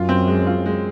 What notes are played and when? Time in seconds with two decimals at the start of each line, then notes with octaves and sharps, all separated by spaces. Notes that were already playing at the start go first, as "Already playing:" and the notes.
Already playing: F#2 F4
0.09 C4
0.27 G#3
0.47 F4
0.66 G#3